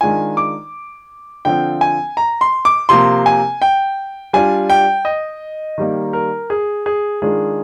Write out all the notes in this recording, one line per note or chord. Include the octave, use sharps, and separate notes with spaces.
D#3 G#3 D4 F4 G#5
D6
D3 F3 C4 F4 G5
G#5
A#5
C6
D6
C3 F3 A#3 C6
G#5
G5
G3 D4 F4 G#5
G5
D#5
D#3 G3 A#3
A#4
G#4
G#4
D#3 G#3 D4 F4 G#4